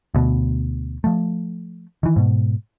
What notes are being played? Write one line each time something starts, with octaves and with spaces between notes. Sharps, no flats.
D2 B2
F3 A3
D#3 E3
G#2 B2